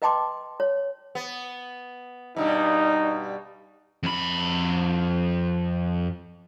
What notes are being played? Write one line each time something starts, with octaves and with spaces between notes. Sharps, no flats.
B4 D#5 G5 A5 C6 D6
C#5
B3
G2 B2 G3 D#4
F2 B5